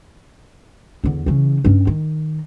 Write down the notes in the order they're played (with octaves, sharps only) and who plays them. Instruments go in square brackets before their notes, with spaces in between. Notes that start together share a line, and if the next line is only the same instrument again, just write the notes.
[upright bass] E2 D3
C#3 E3
G2 C#4
D#3